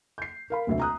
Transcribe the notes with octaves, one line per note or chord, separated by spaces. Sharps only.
G6 C7
A#4 F5 B5
F1 D2 E5
A#5 D#6 F#6